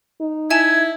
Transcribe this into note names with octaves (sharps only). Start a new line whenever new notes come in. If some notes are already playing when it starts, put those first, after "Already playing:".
D#4
E4 E5 G#5 A5 G#6